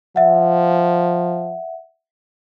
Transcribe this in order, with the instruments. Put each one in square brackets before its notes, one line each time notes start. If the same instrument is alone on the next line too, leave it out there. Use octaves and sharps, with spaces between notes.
[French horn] F3 [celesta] E5 F#5